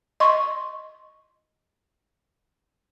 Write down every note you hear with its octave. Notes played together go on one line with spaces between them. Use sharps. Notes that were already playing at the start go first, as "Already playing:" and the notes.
D#5 C6 C#6